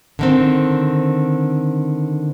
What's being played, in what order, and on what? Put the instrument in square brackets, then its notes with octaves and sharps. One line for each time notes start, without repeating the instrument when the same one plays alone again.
[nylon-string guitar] D3 D#3 C4